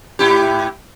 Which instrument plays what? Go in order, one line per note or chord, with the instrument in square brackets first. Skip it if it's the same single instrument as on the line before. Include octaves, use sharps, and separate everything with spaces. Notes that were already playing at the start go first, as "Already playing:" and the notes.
[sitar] A2 E4 G4